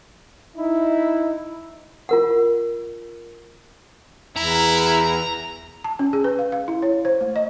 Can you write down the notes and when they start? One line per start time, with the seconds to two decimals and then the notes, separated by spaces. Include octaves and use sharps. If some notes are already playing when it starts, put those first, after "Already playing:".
0.57 D#4 E4
2.09 F4 A#4 F#5
4.37 E2 E4 A#5
5.84 A5
5.99 C#4
6.13 G#4
6.24 B4
6.39 F5
6.52 F5
6.68 E4
6.82 C#5
7.05 C5
7.21 A3
7.36 D#5